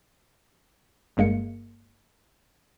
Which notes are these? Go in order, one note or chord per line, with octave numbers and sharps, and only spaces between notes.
G1 G2 G#3 A#3 C#7